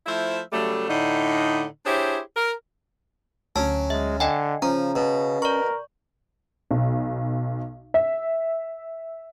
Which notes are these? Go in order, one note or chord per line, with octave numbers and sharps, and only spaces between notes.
F3 A3 E4 C5 E5
C#3 F#3 G3 A3
A2 D3 D#4
D4 E4 G4 G#4 C5 C#5
A#4
D2 F#3 C#4 A5
G#3 E5
D3 D#5 G5 G#5
C#3 F3 C#4 A#5
B2
A#4 D5 C#6
B1
E5